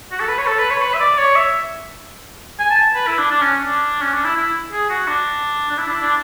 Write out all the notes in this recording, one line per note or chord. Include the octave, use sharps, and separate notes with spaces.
F#4
A4
B4
C#5
A4
B4
C#5
B4
E5
D5
C#5
E5
G#5
A5
B4
E4
D4
D4
C#4
D4
C#4
D4
E4
E4
G#4
F#4
D4
D4
E4
D4
E4
D4